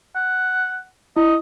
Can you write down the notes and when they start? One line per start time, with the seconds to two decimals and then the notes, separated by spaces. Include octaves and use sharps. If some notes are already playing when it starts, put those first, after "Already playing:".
0.15 F#5
1.16 E4 D#5